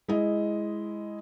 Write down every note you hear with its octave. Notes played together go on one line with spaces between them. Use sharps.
G#3 E4 D#5